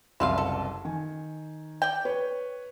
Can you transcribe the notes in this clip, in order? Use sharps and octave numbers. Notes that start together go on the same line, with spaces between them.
F#1 C2 E4 F4 F5
A4
D#3 G#5
D5 G5
B4 C#5